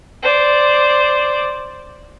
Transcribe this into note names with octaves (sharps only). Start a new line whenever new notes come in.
C5 D5